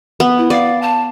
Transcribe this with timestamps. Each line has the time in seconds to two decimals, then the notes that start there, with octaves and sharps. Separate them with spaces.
0.20 B3
0.38 E4
0.50 D5 F5
0.82 A5